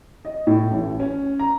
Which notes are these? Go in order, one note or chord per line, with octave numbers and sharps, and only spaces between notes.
D#5
A2
A1
C#4
A#5